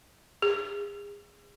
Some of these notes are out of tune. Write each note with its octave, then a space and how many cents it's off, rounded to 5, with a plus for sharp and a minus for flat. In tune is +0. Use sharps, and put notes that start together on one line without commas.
G#4 -25